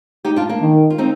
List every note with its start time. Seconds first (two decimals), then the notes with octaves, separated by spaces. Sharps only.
0.25 D#4 G4
0.36 D4 F4
0.49 A#3 D4
0.61 D#3
0.90 F4
0.98 C4 D#4